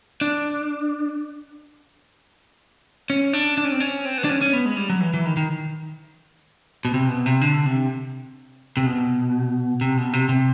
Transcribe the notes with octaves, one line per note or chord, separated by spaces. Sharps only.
D4
C#4
D4
D4
C#4
C4
C#4
C4
B3
D4
C#4
C#4
B3
G#3
G3
F#3
E3
E3
D#3
D#3
B2
C3
B2
C3
D3
C3
C3
B2
C3
B2
C3
C3